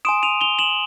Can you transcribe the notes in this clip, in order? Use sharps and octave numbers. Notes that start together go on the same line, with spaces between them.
G#5 C6 D#6 D7 E7
D#7 F7
F7 G7
E7 F#7